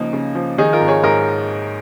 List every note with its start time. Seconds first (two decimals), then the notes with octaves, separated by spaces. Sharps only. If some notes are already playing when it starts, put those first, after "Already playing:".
Already playing: C#2 C#3 F3 A#3 D#4
0.13 C#3
0.35 F3
0.58 D#3 D#4 G#4
0.73 F4 A#4
0.80 G#1
0.88 G#4 C#5
1.03 G#2 A#4 D#5